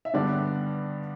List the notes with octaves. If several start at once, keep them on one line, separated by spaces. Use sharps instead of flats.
E5
G2 D3 G3 B3 D4 D5